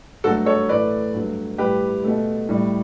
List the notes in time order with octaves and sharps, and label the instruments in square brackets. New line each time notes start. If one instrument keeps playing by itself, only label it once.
[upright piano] G2 F#3 A3 F#4 A4
A4 C#5
A2 E3 A3 B4 D5
G2 F#3 A3
A2 G3 G4 B4
B2 A3
A2 G3